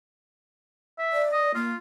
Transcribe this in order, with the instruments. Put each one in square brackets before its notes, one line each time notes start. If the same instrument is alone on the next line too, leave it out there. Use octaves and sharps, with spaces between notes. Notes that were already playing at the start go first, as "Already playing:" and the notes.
[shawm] E5
[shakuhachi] D5
[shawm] D#5
[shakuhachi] A#3 [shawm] F4